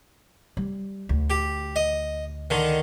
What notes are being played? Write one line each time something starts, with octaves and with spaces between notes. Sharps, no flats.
G3
D2
G4
D#5
D3 D#3